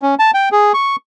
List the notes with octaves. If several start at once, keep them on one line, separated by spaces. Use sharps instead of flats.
C#4
A5
G5
G#4
C#6